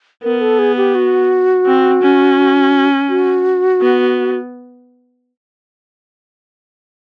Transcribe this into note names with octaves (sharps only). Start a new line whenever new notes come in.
B3 A#4
A4
G#4
G4
F#4
C4
C#4
F#4
B3